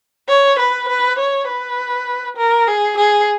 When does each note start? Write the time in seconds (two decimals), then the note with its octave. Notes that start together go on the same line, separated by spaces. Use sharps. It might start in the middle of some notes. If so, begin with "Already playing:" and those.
0.28 C#5
0.59 B4
0.88 B4
1.19 C#5
1.47 B4
2.37 A#4
2.67 G#4
2.97 G#4